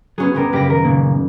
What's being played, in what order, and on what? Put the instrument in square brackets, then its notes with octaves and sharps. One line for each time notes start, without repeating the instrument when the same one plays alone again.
[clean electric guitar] F#3 [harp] B3 C#4 G#4
[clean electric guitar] D2 G2 A#4 [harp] G3 B3 C#4
[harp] F#1 A#6 [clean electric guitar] A#3 G4
[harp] D#3 [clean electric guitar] A#4
[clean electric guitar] A#2 C#3 A#3